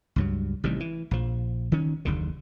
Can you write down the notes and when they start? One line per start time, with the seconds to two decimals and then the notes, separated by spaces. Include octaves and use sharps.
0.16 C#2 G2 F#3
0.64 A1 C3 D#3 G3
0.80 E3
1.11 A#1 F3
1.72 D#3 C#4
2.05 F#1 D#2 D3